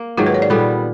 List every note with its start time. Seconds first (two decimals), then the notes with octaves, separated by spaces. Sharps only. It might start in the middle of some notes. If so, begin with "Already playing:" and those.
Already playing: A#3
0.18 G#2 D#3 F#3 F4
0.26 B4
0.34 C#5
0.42 D5
0.50 A#2 G3 B3 A4